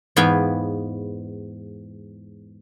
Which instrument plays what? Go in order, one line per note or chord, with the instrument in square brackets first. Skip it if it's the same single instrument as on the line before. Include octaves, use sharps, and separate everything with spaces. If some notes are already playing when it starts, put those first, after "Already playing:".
[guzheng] E2 G#2 B3 F5 G5 G#5